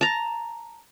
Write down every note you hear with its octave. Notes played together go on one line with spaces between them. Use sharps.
A5 A#5